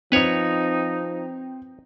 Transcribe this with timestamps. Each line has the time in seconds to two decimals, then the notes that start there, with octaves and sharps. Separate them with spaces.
0.12 F3 C4 D#4 B4 C#5 F7